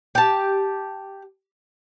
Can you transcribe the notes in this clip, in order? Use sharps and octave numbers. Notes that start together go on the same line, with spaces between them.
G4 A5